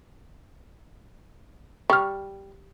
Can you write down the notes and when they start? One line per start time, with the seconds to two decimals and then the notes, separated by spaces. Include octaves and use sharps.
1.90 G3 C#6 F6